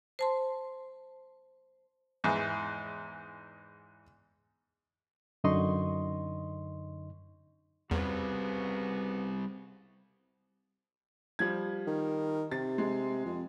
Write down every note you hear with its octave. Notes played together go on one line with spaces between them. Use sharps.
C5 A5 C6
E2 G#2 E3
F#2 D3 D#4 D#5 C6 C#6
E2 C#3 G3 B3 C4 F#4
F3 G3 G#6
D#3
C3 A6
G#3
F2